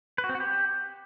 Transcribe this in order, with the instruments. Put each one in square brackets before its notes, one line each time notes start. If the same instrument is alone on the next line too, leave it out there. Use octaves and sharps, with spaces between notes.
[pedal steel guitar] B4
F#4
C4
F#4
G4